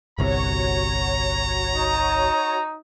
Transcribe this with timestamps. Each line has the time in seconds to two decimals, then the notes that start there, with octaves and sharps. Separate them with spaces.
0.18 G1 C2 C3 F#4 C#5 A#5
1.75 D#4